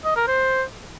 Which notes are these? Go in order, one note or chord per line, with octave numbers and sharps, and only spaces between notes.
D#5
A#4
C5